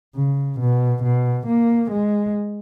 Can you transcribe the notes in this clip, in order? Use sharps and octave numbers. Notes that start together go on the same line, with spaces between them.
C#3
B2
B2
A#3
G#3